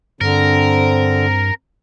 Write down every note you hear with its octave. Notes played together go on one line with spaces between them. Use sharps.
G2 D3 C4 A#4